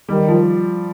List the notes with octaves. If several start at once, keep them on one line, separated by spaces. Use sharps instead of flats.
D#3 G3
F3